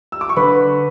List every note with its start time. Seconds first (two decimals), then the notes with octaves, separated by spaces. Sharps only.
0.12 E6
0.21 D6
0.29 C#6
0.37 D3 B4 B5